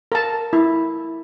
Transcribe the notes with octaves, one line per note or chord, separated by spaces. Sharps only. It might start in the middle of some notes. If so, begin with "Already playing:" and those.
A#4 A5
E4